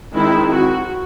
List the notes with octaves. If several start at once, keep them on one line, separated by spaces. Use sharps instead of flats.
D#3 G#3 C4 E4
F#4